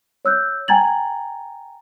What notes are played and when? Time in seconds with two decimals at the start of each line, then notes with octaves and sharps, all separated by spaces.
0.25 C#5 E6 F#6 G6
0.68 G5 G#5 A#5 G#6 A6 F#7